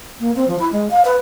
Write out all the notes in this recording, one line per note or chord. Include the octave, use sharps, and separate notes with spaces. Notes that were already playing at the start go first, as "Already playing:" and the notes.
A#3
C4
F3
E4
G#3
F5
B4